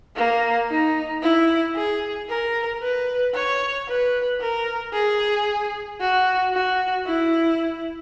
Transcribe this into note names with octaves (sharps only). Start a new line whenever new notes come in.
A#3
D#4
E4
G#4
A#4
B4
C#5
B4
A#4
G#4
F#4
F#4
E4